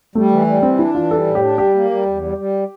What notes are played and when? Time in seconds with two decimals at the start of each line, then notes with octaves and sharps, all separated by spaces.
0.15 G3 A3
0.31 E3
0.47 G3
0.62 E3 C4
0.79 D4 E4
0.95 E3 F4
1.10 G3 A4
1.26 A2
1.35 G4
1.43 D4
1.58 G3 G4
1.74 A#3
1.91 G3
2.06 E2
2.22 G3
2.38 G3